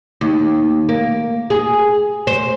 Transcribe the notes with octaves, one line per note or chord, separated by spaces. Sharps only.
D#2
A#3
G#4
C5